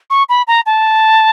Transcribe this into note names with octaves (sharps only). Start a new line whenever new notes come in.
C#6
B5
A#5
A5